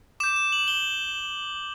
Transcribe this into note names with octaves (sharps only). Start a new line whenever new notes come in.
D6 G6 E7
E7
F#7
G7